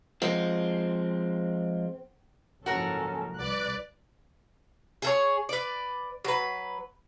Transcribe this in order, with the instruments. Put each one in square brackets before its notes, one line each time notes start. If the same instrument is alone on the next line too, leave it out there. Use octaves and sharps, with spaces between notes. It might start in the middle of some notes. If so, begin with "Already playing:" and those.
[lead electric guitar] F3 G#3 [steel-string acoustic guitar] C4
[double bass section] F#1 G#2 F3 [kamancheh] C#4 A4 [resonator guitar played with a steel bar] F#4 A#4
[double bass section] C2 [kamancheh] B4 F#6 [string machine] D5
[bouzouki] G#4 A4 C#5
B4 D5
F#3 B4